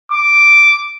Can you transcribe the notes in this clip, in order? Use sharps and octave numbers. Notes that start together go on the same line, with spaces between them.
D6